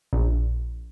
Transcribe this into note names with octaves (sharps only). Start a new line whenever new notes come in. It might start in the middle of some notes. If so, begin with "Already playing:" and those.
A#1